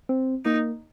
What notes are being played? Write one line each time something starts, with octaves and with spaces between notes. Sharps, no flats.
C4
A#3 D#4